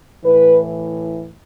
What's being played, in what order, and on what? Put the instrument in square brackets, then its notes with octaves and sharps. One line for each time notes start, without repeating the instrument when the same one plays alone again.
[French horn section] A2 E3 B4